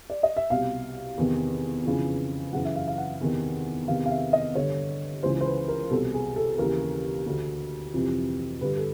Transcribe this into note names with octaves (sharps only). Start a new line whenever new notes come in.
D5
D#5
E5
C2 B2 F5
E2 C3 D#3
F2 C#3 E3
F#2 C#3 E3 F#5
E5
F5
F5
F#5
E2 C3 D#3
E2 C3 D#3 F5
F5
E5
D#5
G2 D3 C#5
C#2 C#3 E3 C5
C5
B4
A#4
C2 B2 A4
G#4
A4
D#2 C#3 E3 A#4
D2 D3
F2 C3 E3
G2 D3 B4
A4